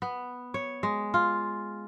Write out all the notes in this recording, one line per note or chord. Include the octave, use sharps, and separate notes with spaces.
B3
C#5
G#3
F4